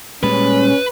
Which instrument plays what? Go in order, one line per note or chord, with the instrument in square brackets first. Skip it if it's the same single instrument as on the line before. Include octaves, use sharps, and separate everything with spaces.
[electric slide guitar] A#2 G3 G#3 [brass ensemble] C#4 [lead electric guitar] B4